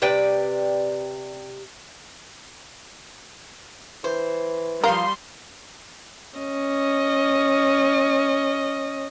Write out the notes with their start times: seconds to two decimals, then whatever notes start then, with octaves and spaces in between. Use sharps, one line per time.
0.02 C3 B4 D5 G5
4.04 E3 C5
4.84 F3 G3 A#4 F5 C6
6.38 C#4 D#5